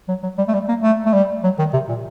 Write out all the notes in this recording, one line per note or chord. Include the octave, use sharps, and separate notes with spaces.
F#3
F#3
G3
A3
G3
A#3
A3
A3
G3
F#3
D#3
C3
A#2